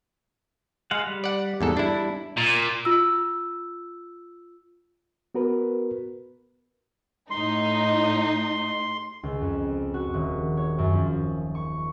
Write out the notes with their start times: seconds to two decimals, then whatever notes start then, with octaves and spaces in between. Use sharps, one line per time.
0.91 G#3 F5 F#5
1.07 G3
1.24 D5 F#5
1.61 E2 G#2 A4
1.77 D4 E4
2.37 A#2
2.85 F4 E6
5.35 B3 F#4 A#4 B4
7.31 A2 D#4 C6
9.23 C#2
9.41 F2
9.94 F#4
10.14 D#1
10.57 C#5
10.78 F#2
10.93 F3
11.55 C#6